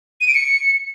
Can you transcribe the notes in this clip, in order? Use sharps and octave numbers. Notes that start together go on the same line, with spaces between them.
D#7
D7
C#7